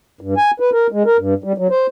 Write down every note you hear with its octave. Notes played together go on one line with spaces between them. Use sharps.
G2
G#5
B4
A#4
G#3
A#4
G2
G3
F#3
C5